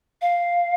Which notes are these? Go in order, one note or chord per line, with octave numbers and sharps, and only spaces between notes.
F5